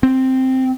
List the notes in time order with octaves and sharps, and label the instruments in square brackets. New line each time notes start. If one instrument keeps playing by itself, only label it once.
[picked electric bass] C4